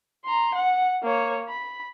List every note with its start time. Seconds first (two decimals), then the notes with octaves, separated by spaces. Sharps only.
0.25 A#5 C6
0.55 F#5
1.03 A#3 C#5
1.49 B5